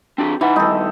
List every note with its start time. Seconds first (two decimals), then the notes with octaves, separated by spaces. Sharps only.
0.18 C4 D4 G4
0.41 E3 D#4 F#5
0.56 G2 D#3 D#4 A4